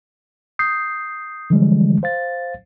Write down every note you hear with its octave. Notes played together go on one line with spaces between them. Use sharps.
D#6 G6 C7
D3 E3 F3 G3 G#3
C5 F5 A6